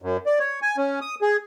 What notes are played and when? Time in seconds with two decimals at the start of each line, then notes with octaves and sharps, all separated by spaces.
0.02 F#2
0.26 D5
0.39 C#5
0.62 G#5
0.77 C#4
1.01 D#6
1.22 G#4